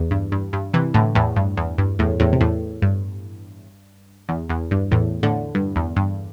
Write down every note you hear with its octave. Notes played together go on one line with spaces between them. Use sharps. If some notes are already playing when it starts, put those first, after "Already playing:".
Already playing: E2
G2
G2
G2
C3 E3
A2 D3
E2 A2
G2
E2
G2
E2 A2
E2 A2
C3
E2 A2
G2
E2
E2
G2
E2 A2
A2 D3
G2
E2
G2